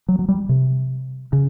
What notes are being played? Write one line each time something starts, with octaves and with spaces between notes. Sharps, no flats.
F#3
F#3
G3
C3
C#3